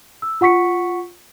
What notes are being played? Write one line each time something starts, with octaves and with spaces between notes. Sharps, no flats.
E6
F4 F#5 C#6 B6 C#7